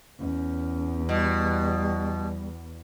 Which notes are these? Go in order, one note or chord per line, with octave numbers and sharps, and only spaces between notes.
E2 C#4
B2 G3